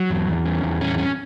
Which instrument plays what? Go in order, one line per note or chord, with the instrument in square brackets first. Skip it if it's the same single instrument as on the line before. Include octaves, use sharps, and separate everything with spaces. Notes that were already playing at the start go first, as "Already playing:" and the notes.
Already playing: [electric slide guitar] F#3
E2
E2
C#4
E2
C#4
C#4